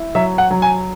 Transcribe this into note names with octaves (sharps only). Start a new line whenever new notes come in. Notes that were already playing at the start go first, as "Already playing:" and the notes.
Already playing: E4
F#3 E5
F#5
F#3
G#5